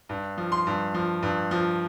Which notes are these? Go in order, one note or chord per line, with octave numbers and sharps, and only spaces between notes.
G2
F3
C6
G2
F3
G2
F3